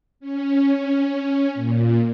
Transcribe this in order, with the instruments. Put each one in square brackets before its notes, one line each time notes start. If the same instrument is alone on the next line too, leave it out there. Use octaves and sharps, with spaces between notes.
[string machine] C#4
A#2